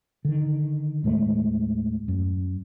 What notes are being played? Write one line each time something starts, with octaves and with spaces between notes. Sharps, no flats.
D3 D#3
D#2 A2 G#3 A3
F#2